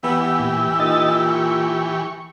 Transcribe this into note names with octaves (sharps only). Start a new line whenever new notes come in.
E3 B3 G4 E6
A#2
A#2 D#4 D#5 A6
C#6